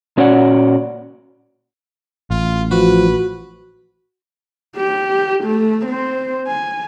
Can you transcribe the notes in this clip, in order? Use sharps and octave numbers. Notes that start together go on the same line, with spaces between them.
A#2 C#4 F#4 C#5 D5 F#5
A1 F4
F3 F#4 B4
G4
A3
C4 C5
G#5